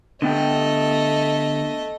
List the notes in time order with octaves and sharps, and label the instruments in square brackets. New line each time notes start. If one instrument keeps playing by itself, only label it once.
[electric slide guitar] D3 B3 G5 [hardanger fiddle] A3 D#5